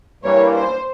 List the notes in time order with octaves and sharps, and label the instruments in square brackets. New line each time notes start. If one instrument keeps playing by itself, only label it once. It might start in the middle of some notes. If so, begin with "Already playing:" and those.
[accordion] G2 E3 G3 A#3 [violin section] C#5
[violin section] C5